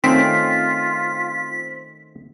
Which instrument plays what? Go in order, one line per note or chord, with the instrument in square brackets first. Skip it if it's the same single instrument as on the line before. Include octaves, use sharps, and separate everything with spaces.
[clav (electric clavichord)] D#3 A3 C#4 [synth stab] C4 [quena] F4 [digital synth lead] B6